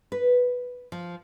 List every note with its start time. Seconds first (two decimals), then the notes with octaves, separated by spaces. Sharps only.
0.12 B4
0.92 F3